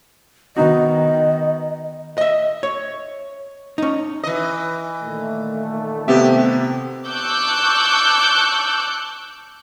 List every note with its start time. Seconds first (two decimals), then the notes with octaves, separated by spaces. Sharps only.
0.57 D#3 B3 D#4 F#4 D#5
2.18 D#5 E5
2.63 C#5
3.78 C#4 D#4
4.23 E3 D#5
5.04 A#2 D#3 A3
6.08 C3 B3 C4 G4 E5
7.07 A5 C#6 D6 E6 F#6 G6